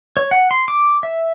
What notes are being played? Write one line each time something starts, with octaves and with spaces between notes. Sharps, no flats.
C#5
F#5
C6
D6
E5